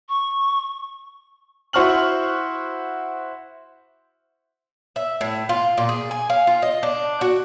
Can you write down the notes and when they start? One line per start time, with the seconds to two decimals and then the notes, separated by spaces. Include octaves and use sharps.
0.09 C#6
1.73 E4 F#4 C5 C#6 F6 F#7
4.96 E5
5.21 A2
5.49 F4
5.78 A#2
5.89 G#4
6.11 G#5
6.30 F5
6.47 F4
6.62 D#5
6.83 D4
7.21 F#4